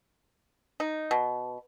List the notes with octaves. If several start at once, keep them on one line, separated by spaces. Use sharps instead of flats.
D#4
B2